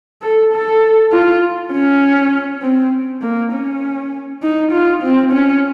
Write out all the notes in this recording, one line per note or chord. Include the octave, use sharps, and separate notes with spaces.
A4
A4
F4
C#4
C4
A#3
C#4
D#4
F4
C4
C#4